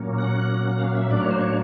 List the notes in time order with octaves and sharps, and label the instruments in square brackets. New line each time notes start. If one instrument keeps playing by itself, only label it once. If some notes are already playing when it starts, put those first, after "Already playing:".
Already playing: [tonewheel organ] A#2 F#3 A#3 C#4
F#5
F5
E5
A2 F#3 A#3 D4 D5
C#5
C5
C#5